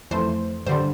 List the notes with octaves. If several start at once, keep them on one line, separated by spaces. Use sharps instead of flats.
F2 E3 A3 C5
G2 D3 G3 C5